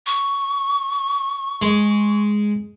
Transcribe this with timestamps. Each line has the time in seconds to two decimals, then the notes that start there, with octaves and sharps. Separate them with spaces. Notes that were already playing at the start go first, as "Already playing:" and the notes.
0.07 C#6
1.62 G#3